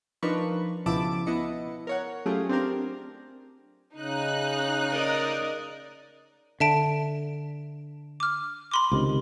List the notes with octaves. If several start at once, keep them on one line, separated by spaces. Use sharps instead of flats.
F3 D4 D#4 A#4 B4 C#6
C#2 B2 F3 E4 A5 D6
B3 E4 D#5 C#7
A#4 C#5 F#5
F#3 A3 C#4 F4 G4 G#4
C4 D4 G4 A#4
C#3 D#4 F#6
A#4 D5 D#5
D3 E5 A5 D7
D6 F6
B5 C6 D6
C#2 C3 D#3